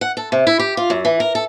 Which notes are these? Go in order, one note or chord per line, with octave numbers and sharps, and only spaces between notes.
F#5
A4
C3
E4
G4
F4
F#2
E3
A#4
A4